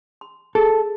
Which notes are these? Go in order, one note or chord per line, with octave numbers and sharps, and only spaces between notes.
C6
G#4 A4